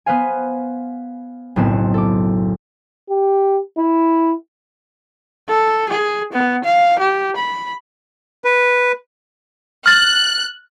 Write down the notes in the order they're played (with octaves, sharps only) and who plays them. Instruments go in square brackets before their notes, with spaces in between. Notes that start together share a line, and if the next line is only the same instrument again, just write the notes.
[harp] B3 B4 C5 F5 G#5
F#1 B1 A2 B3 C4 E7
A4 D6
[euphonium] G4
E4
[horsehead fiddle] A4
G#4
B3
F5
G4
B5
[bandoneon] B4
[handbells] F6 A6 [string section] F#6